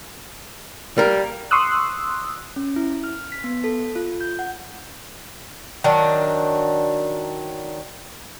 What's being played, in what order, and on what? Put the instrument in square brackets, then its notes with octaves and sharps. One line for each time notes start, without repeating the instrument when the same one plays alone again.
[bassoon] G3 [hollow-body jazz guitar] A#3 A#4
[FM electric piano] C6 C#6 D#6 E6 F#6
[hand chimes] C#4
E4
F6
B6
B3
A4
F4
G6
F#5
[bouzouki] D#3 F#3 D4